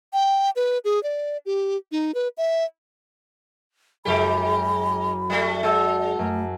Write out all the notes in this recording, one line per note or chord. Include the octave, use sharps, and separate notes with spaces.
G5
B4
G#4
D5
G4
D#4
B4
E5
F#1 F#2 G#3 G4 B5
G3 A3
G#3 F#4 D5 A5 E6
F#2 A3